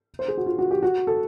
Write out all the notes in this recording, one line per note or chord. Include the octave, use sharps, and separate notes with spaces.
C5
G#4
F#4
F4
F#4
G4
F#4
A4